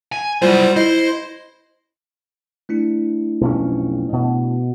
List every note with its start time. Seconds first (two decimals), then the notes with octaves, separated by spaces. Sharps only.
0.12 G#5
0.42 F#3 G3 E4 F4 C5
0.76 E4 C5 D#5
2.69 A3 D4 E4
3.41 B1 F2 C#4
4.13 B2